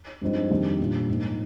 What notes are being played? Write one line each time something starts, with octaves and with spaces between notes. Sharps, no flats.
G2 F3 G#3 C4 D#4
F2 C3 D#3 G3 D4
A#2 G3 D4 F4
G#2 F3 A#3